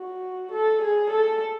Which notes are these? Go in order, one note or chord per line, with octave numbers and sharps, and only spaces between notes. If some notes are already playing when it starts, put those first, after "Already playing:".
Already playing: F#4
A4
G#4
A4